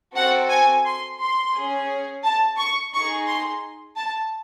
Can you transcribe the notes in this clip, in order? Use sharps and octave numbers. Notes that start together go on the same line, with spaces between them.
C4 F#4 A4 F#5
G#5
C6
C6
C#4 G#4
A5
C#6
D#4 G#4 C#6
C6
A5